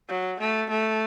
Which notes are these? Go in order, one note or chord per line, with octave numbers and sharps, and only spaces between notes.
F#3
A3
A3